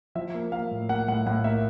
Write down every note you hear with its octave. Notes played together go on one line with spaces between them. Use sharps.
F3 E5
A#3
A#3 F5
A2
A#3 F#5
A2 F#5
A2 F#5
A#3 E5